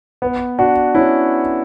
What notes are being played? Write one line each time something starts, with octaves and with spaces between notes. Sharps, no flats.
B3
D4 F#4
C#4 E4